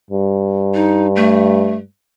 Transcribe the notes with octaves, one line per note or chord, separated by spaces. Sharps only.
G2
D#4
A3